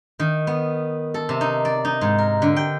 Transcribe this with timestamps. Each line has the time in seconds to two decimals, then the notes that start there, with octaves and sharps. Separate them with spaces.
0.19 D#3
0.47 B3
1.14 A4
1.29 C3
1.41 D#4
1.65 D5
1.85 D#4
2.01 G#2
2.18 A#4
2.42 D3
2.56 G5